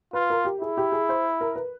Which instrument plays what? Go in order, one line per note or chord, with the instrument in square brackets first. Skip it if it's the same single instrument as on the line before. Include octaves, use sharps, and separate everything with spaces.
[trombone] F4 [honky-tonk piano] B4
[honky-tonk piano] A#4
G4
[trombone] E4 [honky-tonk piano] G#4
[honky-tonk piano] G4
G#4
C5
A#4
B4